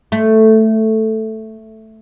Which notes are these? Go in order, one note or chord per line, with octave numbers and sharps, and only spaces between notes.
A3